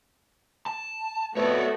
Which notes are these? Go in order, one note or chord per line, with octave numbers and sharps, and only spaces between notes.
A5
F2 A2 A3 B3 F#4 B4 C#5 D5